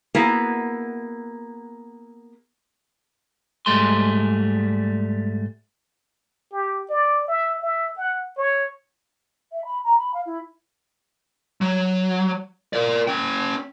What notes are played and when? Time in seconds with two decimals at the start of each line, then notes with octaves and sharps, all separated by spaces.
0.15 A#3 B3 E4 F#4 G#4
3.66 G#2 G3 A3 G#4 C6
6.52 G4
6.89 D5
7.28 E5
7.62 E5
7.97 F#5
8.37 C#5
9.52 E5
9.64 B5
9.84 A#5
9.97 B5
10.13 F5
10.25 E4
11.61 F#3
12.73 A#4 D5
13.08 C#4 G5